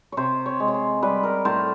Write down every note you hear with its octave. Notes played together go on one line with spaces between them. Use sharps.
C3 C5 C#5
C#5
G#3
C#5
C5
G3 B4
A#4
A2 C5